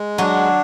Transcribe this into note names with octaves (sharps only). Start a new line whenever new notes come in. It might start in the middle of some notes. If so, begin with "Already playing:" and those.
Already playing: G#3
F#3 D4 F#4